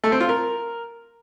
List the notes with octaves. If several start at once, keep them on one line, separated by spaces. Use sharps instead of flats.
A3
C4
F4
A#4